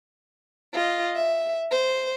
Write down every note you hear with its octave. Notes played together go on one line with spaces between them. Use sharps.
F4 D#5
E5
C5